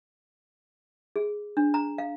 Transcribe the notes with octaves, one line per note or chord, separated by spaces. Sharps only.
G#4
D4
A#5
F5